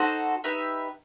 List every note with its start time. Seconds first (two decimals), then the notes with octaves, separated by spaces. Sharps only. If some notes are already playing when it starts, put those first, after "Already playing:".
Already playing: D#4 F#4 A4 C5
0.44 D#4 G4 B4 E5